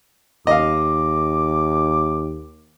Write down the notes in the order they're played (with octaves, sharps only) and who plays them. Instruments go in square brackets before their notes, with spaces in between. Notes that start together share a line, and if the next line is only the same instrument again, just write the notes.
[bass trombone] D#2 [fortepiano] D#5 F5 [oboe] D6